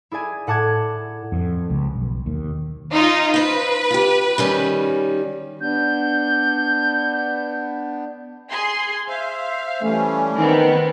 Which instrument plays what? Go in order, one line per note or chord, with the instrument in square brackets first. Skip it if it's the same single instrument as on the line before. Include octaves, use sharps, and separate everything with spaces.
[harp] E4 G#4 D5 G#5
A2 F#5 A5 D6 G#6
[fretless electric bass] F2
C#2
B1
D#2
[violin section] D#4 F4
[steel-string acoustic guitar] F4 C5 [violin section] B4
[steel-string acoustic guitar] F4 G4
D#3 G3 C#4
[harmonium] B3 D4 [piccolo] G6
[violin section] G#4 C6
[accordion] C5 E5 [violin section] F5
[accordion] E3 G3 C#4 [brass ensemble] A3
[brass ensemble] D#3 [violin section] B3 C4